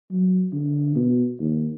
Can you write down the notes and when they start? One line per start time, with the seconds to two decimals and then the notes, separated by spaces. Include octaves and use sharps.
0.11 F#3
0.53 D3
0.95 B2
1.39 D#2